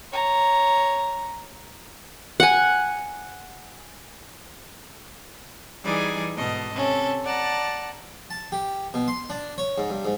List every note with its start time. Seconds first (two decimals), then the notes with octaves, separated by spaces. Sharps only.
0.12 C#5 A#5
2.40 F#5 G#5
5.84 E3 G3 D#4 G#4 D5 G#5
6.36 G#2 B2 A4 D#5
6.74 C3 C#4 A4
7.24 D5 F#5 A5 A#5
8.30 A5
8.52 G4
8.94 B2
9.08 C6
9.30 D4
9.58 C#5
9.78 G#2
9.90 G2
10.05 G#2